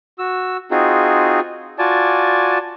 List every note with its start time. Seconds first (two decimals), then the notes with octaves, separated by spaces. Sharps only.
0.19 F#4 E6
0.71 C4 D#4 F4 F#4 G#4
1.79 F4 F#4 D5 G#5 A5